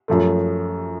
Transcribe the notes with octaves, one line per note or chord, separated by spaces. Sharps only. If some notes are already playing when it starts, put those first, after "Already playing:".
F#2 F3 A3